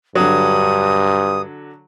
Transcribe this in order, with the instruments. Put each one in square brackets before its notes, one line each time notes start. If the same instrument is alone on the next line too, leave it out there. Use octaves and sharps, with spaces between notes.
[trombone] G2 [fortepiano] D3 F#3 [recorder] D#6